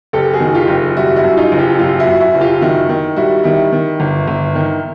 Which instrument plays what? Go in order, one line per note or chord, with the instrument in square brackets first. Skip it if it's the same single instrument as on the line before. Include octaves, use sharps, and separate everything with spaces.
[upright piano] F#1 G4 A4
F#4 G#4
D#3
F4 G4
F#1
G3 E4 F#4
E4 F#4
F#2
D#4 F4
F#1
F4 G4
F#2 F4 G4
E4 F#4
F#2
E4 F#4
F#1
F4 G4
D#3 E4 F#4
D#3
G3 E4 F#4
D#3 E4
D#3
G1
G1
D#3